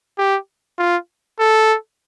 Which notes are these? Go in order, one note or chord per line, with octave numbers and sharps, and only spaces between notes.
G4
F4
A4